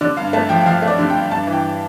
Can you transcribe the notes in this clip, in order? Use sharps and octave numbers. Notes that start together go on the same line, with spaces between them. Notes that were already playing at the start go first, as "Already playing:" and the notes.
D3 D5
G2 F5
A3 A5
F3 G5
G5
F3 F5
A3
D5
D3
G5
G2
G2 A5
E3
G5